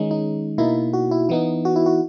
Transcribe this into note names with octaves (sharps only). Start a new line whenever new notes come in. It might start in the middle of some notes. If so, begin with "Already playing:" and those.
Already playing: D#3 G#3 C#4 D#4
D#4
B2 A#3 D#4 E4
F#4
E4
E3 B3 D#4 E4
F#4
E4
F#4